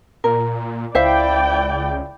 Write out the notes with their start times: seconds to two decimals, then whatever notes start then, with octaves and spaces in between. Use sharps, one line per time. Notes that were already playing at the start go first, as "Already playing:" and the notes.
0.24 A#2 A#4
0.95 C#2 E4 C5 D5 E5 F5 G5